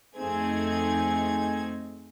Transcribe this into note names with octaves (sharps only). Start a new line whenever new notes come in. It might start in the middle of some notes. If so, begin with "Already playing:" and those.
F2 A3 C4 D#4 G#4 G#6